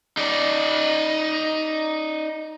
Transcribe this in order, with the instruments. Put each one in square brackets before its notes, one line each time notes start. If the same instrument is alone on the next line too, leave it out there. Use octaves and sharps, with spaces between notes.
[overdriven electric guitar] D#4 D5